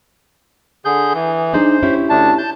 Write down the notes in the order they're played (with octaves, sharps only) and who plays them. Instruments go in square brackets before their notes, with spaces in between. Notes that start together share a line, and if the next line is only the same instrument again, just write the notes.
[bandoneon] D3 G#4 G6
E3
[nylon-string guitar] D4 D#4 G#4 [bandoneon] C5
[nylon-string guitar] C#4 E4 G4
[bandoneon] D2 D4 A5
A5 G6